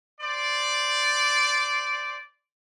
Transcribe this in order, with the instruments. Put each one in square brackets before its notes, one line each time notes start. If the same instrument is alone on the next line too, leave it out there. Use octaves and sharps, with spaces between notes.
[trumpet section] C5 D5